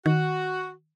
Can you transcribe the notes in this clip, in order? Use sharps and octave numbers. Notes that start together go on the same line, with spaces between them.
D#3 F#4